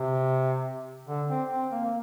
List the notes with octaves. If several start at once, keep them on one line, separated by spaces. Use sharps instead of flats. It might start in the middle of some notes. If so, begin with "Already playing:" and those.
Already playing: C3
D3
C4
C4
A#3
A#3